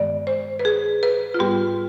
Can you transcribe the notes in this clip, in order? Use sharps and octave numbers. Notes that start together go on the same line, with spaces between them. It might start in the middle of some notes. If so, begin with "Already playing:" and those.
Already playing: G2 D#3 G#3 B3 D5
C5
B4
G#4
B4
F4
G#2 G3 B3 G4